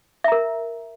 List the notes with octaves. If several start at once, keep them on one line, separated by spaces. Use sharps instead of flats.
A#4 E5 A#5